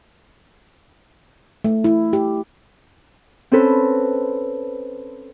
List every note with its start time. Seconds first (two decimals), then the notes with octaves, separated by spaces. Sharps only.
1.64 A3
1.84 E4
2.13 G4
3.52 C4 C#4 A4 B4